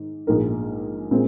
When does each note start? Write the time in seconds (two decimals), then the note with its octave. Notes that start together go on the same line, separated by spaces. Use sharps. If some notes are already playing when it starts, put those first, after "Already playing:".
Already playing: G#2 D#3
0.27 A#1 G#2 G#3 D#4 A#4
1.11 A#2 G#3 C4